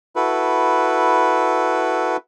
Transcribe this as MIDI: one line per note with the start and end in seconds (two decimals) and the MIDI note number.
0.16 2.17 64
0.16 2.17 66
0.16 2.17 69
0.16 2.17 71